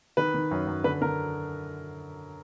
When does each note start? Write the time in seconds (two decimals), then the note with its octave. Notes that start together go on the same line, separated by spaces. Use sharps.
0.17 D#3 B4
0.34 D#3
0.51 F#2
0.67 F#2
0.84 D3 B4
1.02 D3 A#4